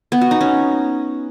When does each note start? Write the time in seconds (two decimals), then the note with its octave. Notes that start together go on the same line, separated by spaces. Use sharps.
0.12 B3
0.21 F#4
0.31 D#4
0.41 C#4